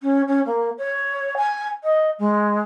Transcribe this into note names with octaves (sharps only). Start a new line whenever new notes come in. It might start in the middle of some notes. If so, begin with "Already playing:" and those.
C#4
C#4
A#3
C#5
G#5
D#5
G#3